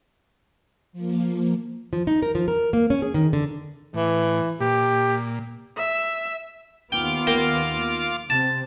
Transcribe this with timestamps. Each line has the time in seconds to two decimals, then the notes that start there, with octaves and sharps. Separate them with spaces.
0.93 F3 A#3
1.93 F3
2.07 D#4
2.22 A#4
2.35 F3
2.48 A#4
2.73 A#3
2.90 C#4
3.02 G#4
3.14 D#3
3.33 D3
3.94 A2 E3
4.60 A#2 G4
5.77 E5
6.92 D#2 D#3 B3 F4 G5 D6 F6
7.27 A#3 G5
8.30 C3 C4 A5